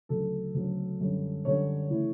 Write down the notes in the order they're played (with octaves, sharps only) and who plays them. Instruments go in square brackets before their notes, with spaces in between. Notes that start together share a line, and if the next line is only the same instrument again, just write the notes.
[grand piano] D2 C#3 F#3 A4
D2 C#3 F#3
F#2 D3 G3 C#4
F#2 D3 G3 C#4 C#5
C#3 E3 A3 E4